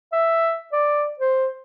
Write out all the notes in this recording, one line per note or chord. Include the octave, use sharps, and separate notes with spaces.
E5
D5
C5